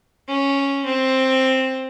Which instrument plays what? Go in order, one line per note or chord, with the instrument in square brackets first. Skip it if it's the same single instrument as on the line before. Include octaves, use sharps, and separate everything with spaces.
[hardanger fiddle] C#4
C4